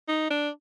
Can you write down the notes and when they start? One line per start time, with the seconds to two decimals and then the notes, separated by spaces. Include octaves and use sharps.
0.08 D#4
0.30 D4